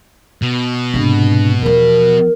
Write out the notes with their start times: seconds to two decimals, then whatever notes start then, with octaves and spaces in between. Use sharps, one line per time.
0.42 B2
0.94 G#2 C3 D4
1.62 E2 F3 A#4